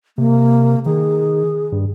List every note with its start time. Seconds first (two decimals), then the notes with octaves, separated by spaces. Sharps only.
0.18 C3 A#3
0.86 D#3 G#4
1.72 G2